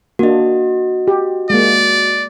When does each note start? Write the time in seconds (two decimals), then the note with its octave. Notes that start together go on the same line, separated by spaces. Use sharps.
0.19 A#3 D4 F#4 D#5
1.08 G4
1.50 G#3 A#3 D5